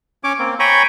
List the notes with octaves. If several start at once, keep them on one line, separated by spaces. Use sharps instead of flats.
C#4 C#5 D6
A#3 C4
C#5 G5 G#5 A#5 B5 C#6